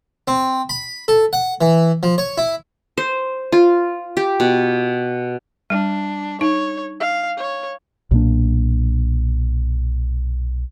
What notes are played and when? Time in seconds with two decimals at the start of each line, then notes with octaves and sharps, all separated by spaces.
0.28 C4
0.69 B5
1.08 A4
1.33 F#5
1.61 E3
2.03 F3
2.18 C#5
2.38 E4
2.98 C5
3.52 F4
4.17 G4
4.40 B2
5.70 G3 D4
6.41 D#4 C#5
7.00 F5
7.38 C#5
8.11 B1 A#2 A#3 D4